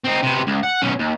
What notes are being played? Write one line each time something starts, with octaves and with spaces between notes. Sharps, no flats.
C4 D#4
C3 B3
C#2
F#5
B1 C#4
D#2